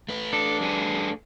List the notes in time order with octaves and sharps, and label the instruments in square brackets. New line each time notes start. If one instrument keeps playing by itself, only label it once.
[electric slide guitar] A3 B4
[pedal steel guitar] D4 [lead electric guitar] A4
[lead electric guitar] G3 G#4